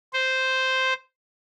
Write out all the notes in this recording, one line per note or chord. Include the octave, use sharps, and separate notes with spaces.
C5